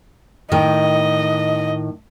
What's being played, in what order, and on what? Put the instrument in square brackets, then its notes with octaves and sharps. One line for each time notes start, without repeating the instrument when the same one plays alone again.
[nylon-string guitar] A2 D#3 G5 [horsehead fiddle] D#5